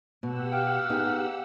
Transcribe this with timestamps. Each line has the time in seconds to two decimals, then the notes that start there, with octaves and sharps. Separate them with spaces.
0.23 B2 G4 F#5 E6
0.53 F5 G5
0.90 B3 D#4 G#4